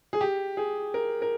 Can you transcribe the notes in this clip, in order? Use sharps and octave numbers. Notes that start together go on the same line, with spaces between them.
G#4
G4
G#4
A#4
A#4